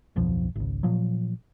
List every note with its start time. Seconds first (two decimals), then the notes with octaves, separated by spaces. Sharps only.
0.16 D1 B1 F2 F3
0.55 G#1 C#2
0.83 A#2 F3 F#3